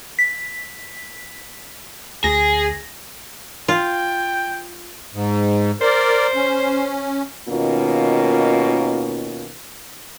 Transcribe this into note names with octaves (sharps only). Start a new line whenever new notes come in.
B6
D2 G#4 A#6
F4 G5
G#2
A#4 C5 D5
C#4
D#2 B2 D#3 A#3 C#4 F4